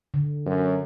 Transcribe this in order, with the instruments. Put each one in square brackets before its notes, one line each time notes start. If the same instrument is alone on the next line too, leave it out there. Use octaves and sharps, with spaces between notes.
[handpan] D3
[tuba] F#2